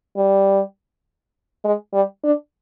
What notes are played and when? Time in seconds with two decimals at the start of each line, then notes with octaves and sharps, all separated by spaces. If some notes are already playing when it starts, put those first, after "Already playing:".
0.16 G3
1.64 G#3
1.93 G3
2.24 D4